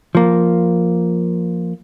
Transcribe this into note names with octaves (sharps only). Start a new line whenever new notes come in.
F3 A#3